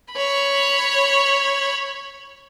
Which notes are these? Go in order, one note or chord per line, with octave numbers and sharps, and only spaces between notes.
C#5 B5